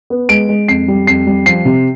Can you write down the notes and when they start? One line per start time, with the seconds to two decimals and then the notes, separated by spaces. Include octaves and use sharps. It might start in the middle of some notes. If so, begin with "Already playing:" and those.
0.10 B3
0.29 G#3 D7
0.49 G#3
0.68 F2 C7
0.88 G3
1.07 F2 C7
1.27 G3
1.46 F3 C7
1.65 C3